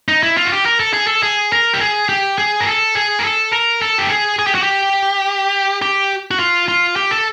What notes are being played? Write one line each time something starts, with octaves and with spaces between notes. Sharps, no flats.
D#4
E4
F4
F#4
G4
A#4
A4
G#4
A4
G#4
A#4
G4
G#4
G4
G#4
A#4
A4
G#4
A#4
A4
A#4
A4
G4
G#4
G#4
G4
F#4
G4
G4
F#4
F4
F4
G4
A4